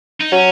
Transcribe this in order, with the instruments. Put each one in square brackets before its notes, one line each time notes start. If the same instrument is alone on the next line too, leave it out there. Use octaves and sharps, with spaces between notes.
[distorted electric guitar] D#4
[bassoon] F#3 [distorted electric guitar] C#4